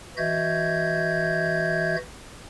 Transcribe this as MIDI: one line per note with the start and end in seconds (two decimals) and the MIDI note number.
0.17 1.96 52
0.17 1.96 66
0.17 1.96 75
0.17 1.96 76
0.17 1.96 91
0.17 1.96 92